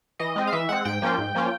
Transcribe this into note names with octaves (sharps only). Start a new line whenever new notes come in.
E3 D#5
G#3 C4
F5
E3 E5
G#3 C4 F#5
G#2 G5
F3 A#3 C#4 F4
G#2
F3 A#3 C#4 F4